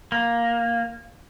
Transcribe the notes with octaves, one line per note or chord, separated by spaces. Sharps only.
A#3